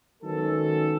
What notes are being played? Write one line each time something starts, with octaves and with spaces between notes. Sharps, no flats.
D#3 F#3 G#3 B3 C#4 A4